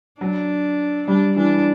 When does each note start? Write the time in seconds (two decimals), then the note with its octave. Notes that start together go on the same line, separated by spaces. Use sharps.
0.21 F#3 D4
1.08 G3 D4
1.37 E3 D4